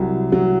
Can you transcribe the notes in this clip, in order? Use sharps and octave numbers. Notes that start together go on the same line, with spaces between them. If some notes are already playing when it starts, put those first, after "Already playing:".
Already playing: C2 F#3
F#3